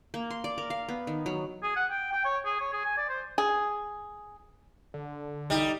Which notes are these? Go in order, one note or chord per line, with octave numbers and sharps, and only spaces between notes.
A#3
C6
D5
A#4
F5
B3
D#3
F#3
G#4
F#5
G5
G5
C#5
G#4
C#5
G#4
G#5
D5
C5
G#4
D3
G3 D#4